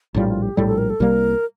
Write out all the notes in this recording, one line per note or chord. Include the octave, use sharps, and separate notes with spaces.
A#1 A2 G3 F4
F4
G4
A#1 A2 G3 A4
A4
A#4
A4
C2 C3 G3 A#3 A#4